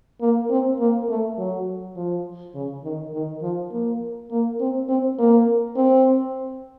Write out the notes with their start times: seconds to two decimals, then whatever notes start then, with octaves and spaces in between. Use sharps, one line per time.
0.21 A#3
0.50 C4
0.79 A#3
1.09 A3
1.38 F#3
1.96 F3
2.55 C#3
2.84 D#3
3.13 D#3
3.42 F3
3.72 A#3
4.31 A#3
4.60 C4
4.88 C4
5.19 A#3
5.76 C4